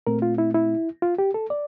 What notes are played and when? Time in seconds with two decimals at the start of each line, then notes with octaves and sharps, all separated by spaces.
0.07 A#2 A3 C4 A#4
0.22 F4
0.38 E4
0.55 E4
1.02 F4
1.19 G4
1.34 A4
1.50 D5